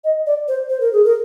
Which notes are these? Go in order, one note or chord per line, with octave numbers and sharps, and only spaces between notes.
D#5
D5
C5
C5
A#4
G#4
A#4